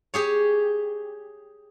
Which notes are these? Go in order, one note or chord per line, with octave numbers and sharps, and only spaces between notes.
G4 G#4 C#5